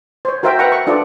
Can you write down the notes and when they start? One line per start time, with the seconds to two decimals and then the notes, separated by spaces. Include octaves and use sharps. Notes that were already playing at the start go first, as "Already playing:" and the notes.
0.25 C5 C#5
0.43 F#4 A#4 C5 E5 F5 G5
0.59 B4 E5 F#5 G5 A#5 C#6
0.72 C#6
0.87 D4 F4 A4 B4 D5